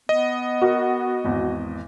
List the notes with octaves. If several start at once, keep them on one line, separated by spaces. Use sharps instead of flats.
B3 D#5
F#4 A#4
G#1 E2